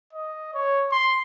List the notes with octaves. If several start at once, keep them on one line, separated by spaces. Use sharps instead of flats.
D#5
C#5
C6